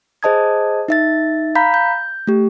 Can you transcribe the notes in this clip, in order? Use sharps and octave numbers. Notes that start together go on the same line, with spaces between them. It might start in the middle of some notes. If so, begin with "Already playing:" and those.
G#4 C5 D#5 A5 D#6 G#6
D#4 E5 A6
F5 A#5 B5 G6 B6
G6
A3 G4